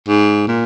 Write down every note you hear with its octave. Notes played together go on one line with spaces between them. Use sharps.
G#2
A#2